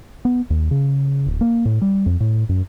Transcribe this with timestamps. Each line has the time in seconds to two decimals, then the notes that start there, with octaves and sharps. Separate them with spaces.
0.25 B3
0.50 D#2
0.71 C#3
1.26 D1
1.41 A#3
1.65 A2
1.82 G3
2.06 F2
2.20 A2
2.49 F#2